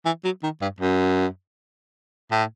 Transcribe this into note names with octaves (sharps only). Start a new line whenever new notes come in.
E3
F#3
D#3
G2
F#2
A2